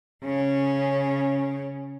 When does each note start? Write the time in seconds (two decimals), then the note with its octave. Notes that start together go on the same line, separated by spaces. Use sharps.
0.23 C#3 C#4